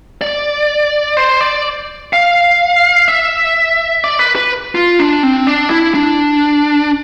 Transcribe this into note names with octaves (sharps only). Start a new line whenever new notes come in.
D5
C5
D5
F5
E5
D5
B4
B4
F4
D4
C4
D4
E4
D4